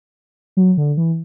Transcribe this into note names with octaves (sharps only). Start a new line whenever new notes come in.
F#3
D3
E3